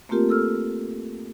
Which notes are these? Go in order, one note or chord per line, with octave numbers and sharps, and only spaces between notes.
A3 A#3 C4 F4 G4 A#4
A4 E6 F6